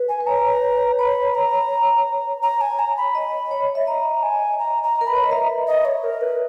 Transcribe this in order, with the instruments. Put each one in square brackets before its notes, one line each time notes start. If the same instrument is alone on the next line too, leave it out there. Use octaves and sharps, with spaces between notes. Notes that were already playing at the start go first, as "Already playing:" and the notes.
Already playing: [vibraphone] B4
[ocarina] G#5
[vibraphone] B4
[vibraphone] C#5 [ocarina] A#5
[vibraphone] C#5 [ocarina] B5
[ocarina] A#5
A#5
G#5
A#5
B5
[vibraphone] D#5
C#5
E5
[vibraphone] D#5 [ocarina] A#5
[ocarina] G#5
A#5
A#5
[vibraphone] A#4
[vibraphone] B4 [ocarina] B5
[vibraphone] C#5
D#5
[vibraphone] E5 [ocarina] A#5
[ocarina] D#5
C#5
A#4
B4